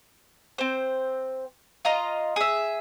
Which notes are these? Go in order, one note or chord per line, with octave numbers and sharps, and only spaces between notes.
C4 C5
F4 D#5 A#5
G#4 E5